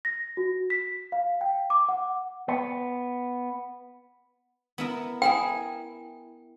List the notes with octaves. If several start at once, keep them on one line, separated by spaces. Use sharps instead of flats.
A#6
F#4
B6
F5
G5
D6
F#5
B3
B3 E4 A#4
E4 G#4 A#4 G5